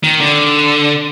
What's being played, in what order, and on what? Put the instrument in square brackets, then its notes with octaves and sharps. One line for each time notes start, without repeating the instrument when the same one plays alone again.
[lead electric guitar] D#3
D3